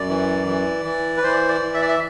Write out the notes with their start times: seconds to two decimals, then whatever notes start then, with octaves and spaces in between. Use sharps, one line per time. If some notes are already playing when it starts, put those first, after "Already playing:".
Already playing: F#2 D5
0.09 E3
0.47 E3
0.85 E3
1.17 B4
1.23 E3 C5
1.49 D5
1.61 E3
1.74 E5
1.82 D5
1.89 E5